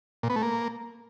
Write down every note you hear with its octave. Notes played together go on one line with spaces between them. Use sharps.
A#2
B3
A3
A#3